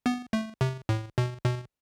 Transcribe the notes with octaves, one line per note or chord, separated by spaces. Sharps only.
B3
A3
C3
A2
B2
B2